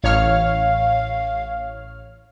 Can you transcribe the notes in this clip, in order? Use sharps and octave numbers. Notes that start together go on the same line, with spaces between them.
A1 C#5 F5 F6